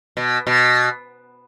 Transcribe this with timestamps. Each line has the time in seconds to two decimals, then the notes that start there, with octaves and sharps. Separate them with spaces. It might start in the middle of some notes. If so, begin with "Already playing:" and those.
0.17 B2
0.47 B2